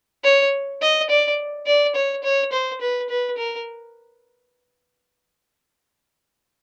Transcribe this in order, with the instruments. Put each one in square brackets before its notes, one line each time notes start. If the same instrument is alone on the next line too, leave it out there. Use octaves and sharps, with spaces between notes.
[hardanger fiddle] C#5
D#5
D5
D5
C#5
C#5
C5
B4
B4
A#4